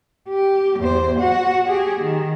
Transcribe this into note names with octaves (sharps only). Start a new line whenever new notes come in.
G4
E2 C5
F#4 F#5
G4 G#4
D#3